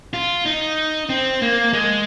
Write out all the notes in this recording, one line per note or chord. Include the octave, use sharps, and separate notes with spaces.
F4
D#4
C4
A#3
G#3